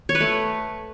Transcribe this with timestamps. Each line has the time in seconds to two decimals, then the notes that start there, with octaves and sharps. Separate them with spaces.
0.09 C#5
0.15 B4
0.20 A3